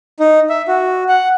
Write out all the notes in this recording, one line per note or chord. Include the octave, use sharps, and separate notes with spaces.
D#4
E5
F#4
F#5